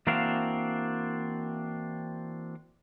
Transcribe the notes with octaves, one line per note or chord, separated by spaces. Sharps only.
E3 A#3 C4 D4 F#4 F5